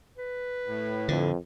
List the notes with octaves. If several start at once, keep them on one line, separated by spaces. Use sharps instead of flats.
B4
A2
F2 D3